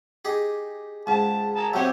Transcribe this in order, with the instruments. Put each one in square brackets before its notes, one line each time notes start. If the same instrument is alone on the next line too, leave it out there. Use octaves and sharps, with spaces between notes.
[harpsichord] D#4 G4 G#4
[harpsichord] C#2 G#2 [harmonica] A5
[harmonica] G#4 A5 A#5
[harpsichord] F#3 C4 [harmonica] G4 C#5 E5